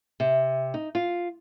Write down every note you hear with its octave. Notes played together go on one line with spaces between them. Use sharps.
C3
D#4
F4